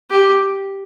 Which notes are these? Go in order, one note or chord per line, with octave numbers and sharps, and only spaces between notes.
G4